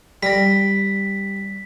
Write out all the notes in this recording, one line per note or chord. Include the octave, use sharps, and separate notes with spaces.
G3 A#6 B6